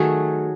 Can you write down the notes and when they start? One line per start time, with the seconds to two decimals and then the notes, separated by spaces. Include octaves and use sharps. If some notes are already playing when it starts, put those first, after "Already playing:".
Already playing: D#3 F#3 A3 F#4 G#4